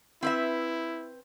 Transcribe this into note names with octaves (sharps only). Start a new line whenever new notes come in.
C4 E4 B4 E5